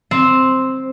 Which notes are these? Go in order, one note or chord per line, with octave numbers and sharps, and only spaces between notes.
C4